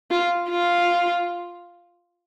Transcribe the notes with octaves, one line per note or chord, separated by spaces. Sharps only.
F4
F4